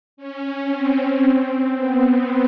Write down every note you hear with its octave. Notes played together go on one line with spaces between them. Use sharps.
C#4
C4
B3